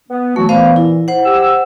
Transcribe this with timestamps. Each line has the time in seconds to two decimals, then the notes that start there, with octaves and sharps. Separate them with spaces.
0.09 B3
0.36 E3 F#3 A3 F#4
0.49 A#2 E3 B3 C5 F5
0.76 E4
1.08 C5 F#5
1.25 G4 E6